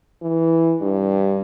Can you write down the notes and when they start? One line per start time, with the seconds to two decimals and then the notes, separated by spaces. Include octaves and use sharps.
0.22 E3
0.81 G2